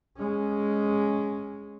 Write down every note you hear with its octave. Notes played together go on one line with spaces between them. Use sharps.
G#3 C#4